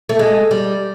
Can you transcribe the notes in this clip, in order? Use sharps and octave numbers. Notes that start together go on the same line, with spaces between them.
A3
G#3
G3